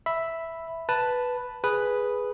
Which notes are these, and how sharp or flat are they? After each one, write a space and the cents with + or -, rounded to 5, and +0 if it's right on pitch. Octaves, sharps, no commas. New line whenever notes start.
E5 +0 B5 +0
B4 +0 A5 +0
G#4 +0 B4 +0